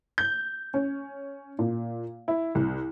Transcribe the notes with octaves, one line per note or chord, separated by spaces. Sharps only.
G6
C#4
A#2
E4
C2